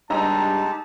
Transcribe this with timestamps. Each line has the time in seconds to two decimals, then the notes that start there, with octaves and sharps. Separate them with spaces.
0.10 G2 G#3 D#4 G4 D#5 A5 A#5 E6